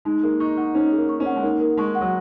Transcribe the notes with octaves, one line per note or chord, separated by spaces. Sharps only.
G#3 D#4
A#3 G#4
D#4 C#6
D#4 F#5
C#4 D#4
G#4
A#3
C#6
C#4
F#5
G#3
A#3 D#4
A#4
G#3 C#6
F#5
F#3